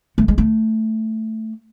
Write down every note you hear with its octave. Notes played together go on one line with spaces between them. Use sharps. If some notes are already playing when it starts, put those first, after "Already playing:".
A3
G#3
A3